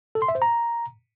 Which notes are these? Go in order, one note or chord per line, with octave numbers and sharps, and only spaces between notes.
A4
C6
E5
C5
A#5